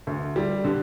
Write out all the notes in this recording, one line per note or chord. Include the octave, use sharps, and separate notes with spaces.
D2
G3
D3